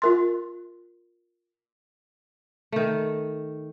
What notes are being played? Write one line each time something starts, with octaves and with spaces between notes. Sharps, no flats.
F4 A#4 C6
D#3 A3